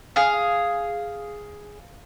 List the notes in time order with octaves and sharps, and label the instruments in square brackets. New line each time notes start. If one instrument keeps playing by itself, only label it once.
[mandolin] G#4 F5